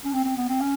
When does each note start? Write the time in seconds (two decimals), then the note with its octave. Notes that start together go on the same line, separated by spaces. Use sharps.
0.05 C#4
0.13 C4
0.25 C4
0.37 B3
0.49 C4
0.61 C#4